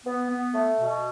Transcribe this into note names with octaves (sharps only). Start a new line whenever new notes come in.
B3
B3
A3
B2